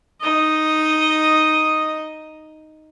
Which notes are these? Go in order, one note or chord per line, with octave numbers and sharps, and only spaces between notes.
D#4 D#5